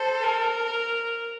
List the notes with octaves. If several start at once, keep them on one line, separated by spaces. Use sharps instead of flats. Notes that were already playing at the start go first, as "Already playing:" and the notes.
Already playing: A4 C5
A#4